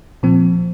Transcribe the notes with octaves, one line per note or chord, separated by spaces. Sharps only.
A#2 F3 C4